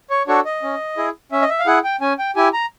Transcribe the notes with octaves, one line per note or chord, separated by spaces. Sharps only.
C#5
D4 F#4 A4 C#5
D#5
C#4
E4 G#4
C#4 E5
D#5
E5
F5
E4 G#4 F#5
G5
C#4 G#5
G5
E4 G4 G#5
A#5